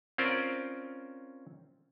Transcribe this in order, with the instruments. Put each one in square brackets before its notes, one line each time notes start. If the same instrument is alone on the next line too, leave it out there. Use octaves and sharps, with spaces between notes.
[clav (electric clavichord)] C4 C#4 F4 A#4 C5 D5